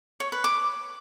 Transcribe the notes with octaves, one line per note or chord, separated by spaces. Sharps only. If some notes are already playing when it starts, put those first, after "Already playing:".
C#5
B4
D6